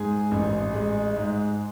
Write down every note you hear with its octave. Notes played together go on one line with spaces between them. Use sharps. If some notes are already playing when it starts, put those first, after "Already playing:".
Already playing: G#2 G#4 G#5
A1
G#3
G#2